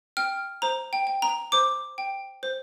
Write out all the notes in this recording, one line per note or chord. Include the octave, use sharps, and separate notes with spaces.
G5 F6
C5 A#5
G5
G5
A#5
C5 D6
G5
C5